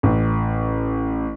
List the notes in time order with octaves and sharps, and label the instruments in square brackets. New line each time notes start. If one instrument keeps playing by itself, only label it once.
[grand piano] A1